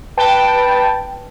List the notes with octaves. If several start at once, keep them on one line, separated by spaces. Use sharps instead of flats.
B4 G5 A5